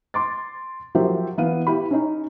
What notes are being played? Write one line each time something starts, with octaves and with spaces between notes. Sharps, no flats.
C6 D6 A6
F3 F#3 G4 A#4 C5 E5
E3 B3 F5 D#7
E4 G4 B5
C#4 D#4